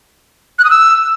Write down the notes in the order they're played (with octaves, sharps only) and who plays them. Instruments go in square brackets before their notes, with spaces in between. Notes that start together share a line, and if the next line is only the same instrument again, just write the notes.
[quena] F#6
D#6
E6